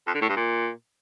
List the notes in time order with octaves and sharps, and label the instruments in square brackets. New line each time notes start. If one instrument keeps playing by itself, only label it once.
[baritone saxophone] F2
D3
A2
G2
A#2